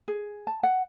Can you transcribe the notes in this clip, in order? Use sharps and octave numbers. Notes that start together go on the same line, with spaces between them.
G#4
A5
F#5